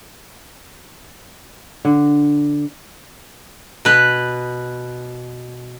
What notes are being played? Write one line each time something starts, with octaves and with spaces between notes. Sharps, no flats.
D3
B2 B4